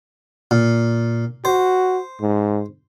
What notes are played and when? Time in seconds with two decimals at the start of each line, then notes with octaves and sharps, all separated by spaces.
0.51 A#2
1.45 F#4 C5
2.21 G#2